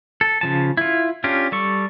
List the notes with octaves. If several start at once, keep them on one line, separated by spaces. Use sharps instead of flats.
A4
C#3 F3 A5
E4 F4
C#4 D4 F4 G4
G3 A4 C#6